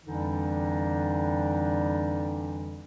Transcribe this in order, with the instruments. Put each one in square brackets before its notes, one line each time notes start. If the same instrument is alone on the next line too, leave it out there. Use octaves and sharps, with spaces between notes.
[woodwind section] F2 D3 E3 G3 D4 D#4